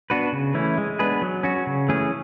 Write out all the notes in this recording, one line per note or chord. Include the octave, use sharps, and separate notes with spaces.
B3 D4 F#4 B4
C#3
E3 A3 C#4 E4
G#3
B3 D4 G#4 B4
F#3
C#4 F#4
C#3
E3 A3 C#4 G#4